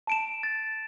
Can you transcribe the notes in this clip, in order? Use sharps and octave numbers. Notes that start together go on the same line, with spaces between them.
A5 D7 E7
A6